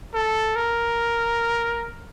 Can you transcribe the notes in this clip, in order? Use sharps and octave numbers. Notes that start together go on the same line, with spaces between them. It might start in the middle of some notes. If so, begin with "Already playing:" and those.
A4
A#4